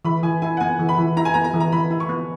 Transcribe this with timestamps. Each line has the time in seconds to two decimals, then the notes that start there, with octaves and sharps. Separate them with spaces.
0.05 E3 B5
0.23 E3 G#5
0.42 E4 G#5
0.57 F#5
0.60 B3 G#5
0.79 E3
0.89 B5
0.98 E3
1.17 E4 A#5
1.25 G#5
1.34 B3 A#5
1.44 A#5
1.53 E3
1.60 A#5
1.72 E3 B5
1.91 E4
2.00 C#6
2.09 B3